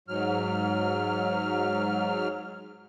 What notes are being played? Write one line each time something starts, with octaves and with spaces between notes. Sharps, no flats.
G#2 F#3 F6